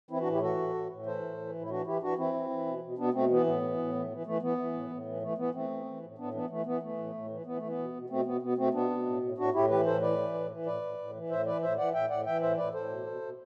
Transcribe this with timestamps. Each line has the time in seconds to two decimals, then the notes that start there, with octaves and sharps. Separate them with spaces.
0.10 E3 C4 E4
0.21 D4 F#4
0.26 A2
0.32 E4 G4
0.42 E3 F#4 A4
0.58 A2
0.74 A2
0.90 A2
1.06 E3 A4 C5
1.23 A2
1.38 E3
1.55 A2
1.62 E4
1.70 E3 D4 F#4
1.86 E3 E4 G4
2.02 E3 D4 F#4
2.18 E3 C4 E4
2.34 E3
2.50 E3
2.66 B2
2.83 B2
2.98 B2 B3 D4
3.14 B2 A3 C4
3.30 E3 B3
3.46 A2 B3
3.62 E3
3.78 A2
3.94 E3
4.10 E3
4.26 E3 A3
4.42 E3 B3
4.58 E3
4.74 A2
4.90 A2
5.06 E3
5.22 E3 A3
5.38 E3 B3
5.54 E3 A3 C4
5.70 E3
5.86 E3
6.02 A2
6.18 A2 B3 D4
6.34 E3 B3 D4
6.50 E3 A3
6.66 E3 B3
6.81 E3 A3
6.98 A2
7.14 A2
7.30 E3
7.46 E3 B3
7.57 A3
7.63 E3
7.69 B3
7.78 B2
7.94 B2
8.10 B2 A3 C4
8.25 B2 B3
8.42 B2 B3
8.57 B2 A3 C4
8.73 B2 B3 D4
8.90 B2
9.06 A2
9.22 A2
9.37 A2 D4 F#4
9.54 A2 E4 G4
9.69 E3 G4 B4
9.86 A2 A4 C5
10.01 E3 B4 D5
10.18 E3
10.34 A2
10.50 E3
10.66 A2 B4 D5
10.82 A2
10.98 A2
11.14 E3
11.30 A2 C5 E5
11.46 E3 B4 D5
11.62 A2 C5 E5
11.77 E3 D5 F#5
11.93 A2 E5 G5
12.10 A2 D5 F#5
12.25 E3 E5 G5
12.41 A2 C5 E5
12.57 A2 B4 D5
12.73 A2 A4 C5
12.89 B2
13.06 B2
13.22 B2